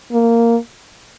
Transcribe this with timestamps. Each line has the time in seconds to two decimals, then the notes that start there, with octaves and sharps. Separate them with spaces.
0.12 A#3